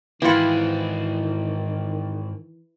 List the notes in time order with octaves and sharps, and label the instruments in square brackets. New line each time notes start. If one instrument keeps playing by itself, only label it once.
[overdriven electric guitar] G#2 C4 [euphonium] D#3 [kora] E3 F4 [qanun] E4 F#5